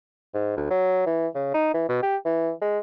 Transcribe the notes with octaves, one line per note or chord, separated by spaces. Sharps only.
G#2
D2
F#3
E3
C#3
D#4
E3
B2
G4
E3
G#3